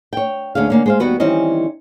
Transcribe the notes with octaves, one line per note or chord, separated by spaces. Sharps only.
C#5 G5
D2 D3 C#4 G#4 F5
D3 A#3 C#4
G#3 C5 F5
D#2 G3 B3 F#4 B4
D#3 E3 G3 C4 C#4 D#5